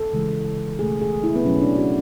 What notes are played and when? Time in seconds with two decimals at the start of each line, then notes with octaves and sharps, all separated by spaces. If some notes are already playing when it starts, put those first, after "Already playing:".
Already playing: A4
0.13 C#3 E3 G#3
0.79 B2 A3 G#4
1.01 G#4
1.24 E4
1.36 B3
1.45 B2 F#3 A3 C#4
1.61 D4
1.77 F#4